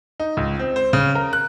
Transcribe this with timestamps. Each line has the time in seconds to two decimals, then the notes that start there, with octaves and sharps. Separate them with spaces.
0.20 D#4
0.37 C#2
0.59 C4
0.76 C5
0.93 C#3
1.15 A#4
1.33 F#6